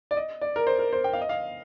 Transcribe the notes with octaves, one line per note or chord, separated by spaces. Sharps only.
D5
D#5
D5
A#4
C5
A#4
C5
G5
F5
D#5
F5